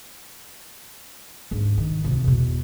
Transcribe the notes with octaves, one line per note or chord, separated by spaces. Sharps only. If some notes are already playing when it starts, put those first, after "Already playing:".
D2 G#2
D#3
D2 C3
E2 B2